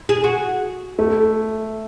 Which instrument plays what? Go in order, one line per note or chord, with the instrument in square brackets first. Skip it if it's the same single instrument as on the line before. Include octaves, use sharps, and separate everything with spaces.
[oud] G#4
F#4
[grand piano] A3